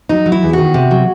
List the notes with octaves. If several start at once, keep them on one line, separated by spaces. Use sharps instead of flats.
F#3 D#4
F#3
E4
E2
D#3 F#4
C3
F#3